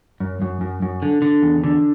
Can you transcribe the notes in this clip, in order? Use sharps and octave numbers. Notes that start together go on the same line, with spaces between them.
F#2
F#2
F#2
F#2
D3
D3
E2
D3